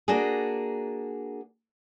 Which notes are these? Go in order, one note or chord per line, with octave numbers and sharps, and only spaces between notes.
A#3 D4 F#4 G#4